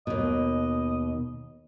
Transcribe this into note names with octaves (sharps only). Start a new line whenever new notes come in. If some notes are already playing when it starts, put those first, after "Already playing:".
D#2 B2 D#5